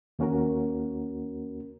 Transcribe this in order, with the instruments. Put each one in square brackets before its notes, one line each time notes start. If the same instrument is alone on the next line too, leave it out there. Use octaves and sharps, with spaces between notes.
[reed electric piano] D#2 A#3 C#4 F#4 A#4